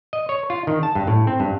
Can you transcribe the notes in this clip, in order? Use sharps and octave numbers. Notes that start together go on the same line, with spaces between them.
D#5
C#5
F4
D#3
A5
G2
A2
C4
G2